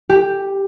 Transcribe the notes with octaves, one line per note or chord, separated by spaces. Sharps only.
G4